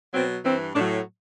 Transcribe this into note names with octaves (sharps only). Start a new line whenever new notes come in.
B2 F#3 C4
G2 E3 C4
A2 F#3 D4